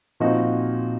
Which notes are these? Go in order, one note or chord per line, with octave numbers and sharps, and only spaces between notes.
A#2 F3 C4 D#4 F#4